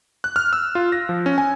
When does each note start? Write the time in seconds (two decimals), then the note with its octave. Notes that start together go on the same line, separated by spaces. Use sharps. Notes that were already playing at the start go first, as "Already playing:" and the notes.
0.24 F#6
0.36 F6
0.53 E6
0.75 F4
0.92 A#6
1.09 F3
1.26 C#4
1.38 G#5